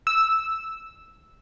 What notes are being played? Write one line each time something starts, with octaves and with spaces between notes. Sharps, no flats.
E6